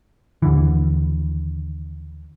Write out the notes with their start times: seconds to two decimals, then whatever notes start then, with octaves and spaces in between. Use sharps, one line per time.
0.42 D#2 D3 E3